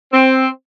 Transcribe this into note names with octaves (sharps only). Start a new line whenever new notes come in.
C4